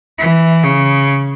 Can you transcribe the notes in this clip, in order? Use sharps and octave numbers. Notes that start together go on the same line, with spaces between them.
E3
C#3